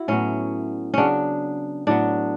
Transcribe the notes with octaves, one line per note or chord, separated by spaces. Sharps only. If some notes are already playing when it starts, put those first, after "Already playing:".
Already playing: E4 F#4
A2 F#3 B3 C#4
C#3 F#3 B3 C#4 D4
A2 F#3 B3 D4